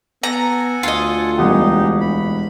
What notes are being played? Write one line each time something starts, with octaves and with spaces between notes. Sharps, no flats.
B3 A4 F#5 G#5 A#5
D2 F4 D#5
E1 G3 D#4 G4 G#4 F#5
B5